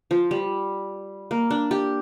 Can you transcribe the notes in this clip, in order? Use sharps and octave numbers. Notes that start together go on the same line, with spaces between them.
F3
G3
A#3
D4
G4